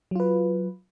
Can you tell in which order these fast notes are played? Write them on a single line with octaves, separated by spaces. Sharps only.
F#3 F4 B4